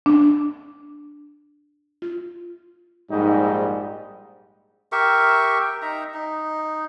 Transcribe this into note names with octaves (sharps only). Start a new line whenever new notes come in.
D4
F4
A#1 G#2 G3 D#4
G4 A#4 E5 C#6
G5
D#4 E5 A#5
D#4